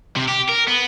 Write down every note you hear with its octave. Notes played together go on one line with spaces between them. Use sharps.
C3
G4
A#4
B3